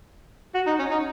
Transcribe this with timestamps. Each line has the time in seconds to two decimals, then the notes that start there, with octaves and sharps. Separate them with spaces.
0.55 F#4
0.67 D#4
0.79 C#4
0.91 D#4